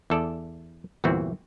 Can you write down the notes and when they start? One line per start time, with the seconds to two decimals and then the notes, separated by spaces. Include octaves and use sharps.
0.10 E2 A4 D5
1.04 G1 E2 A#2 E3 C4 F#4